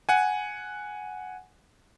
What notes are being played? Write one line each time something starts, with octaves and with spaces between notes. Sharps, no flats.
F#5 G#5